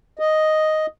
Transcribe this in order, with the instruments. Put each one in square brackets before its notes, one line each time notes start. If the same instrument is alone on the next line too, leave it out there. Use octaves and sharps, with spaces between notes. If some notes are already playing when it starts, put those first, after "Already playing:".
[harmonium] D#5